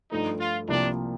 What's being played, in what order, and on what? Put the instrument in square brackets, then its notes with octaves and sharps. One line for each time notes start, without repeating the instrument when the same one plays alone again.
[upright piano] G2 F3 A3 [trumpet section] D#4
[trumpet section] F4
[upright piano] C2 C3 F3 A#3 [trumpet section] D4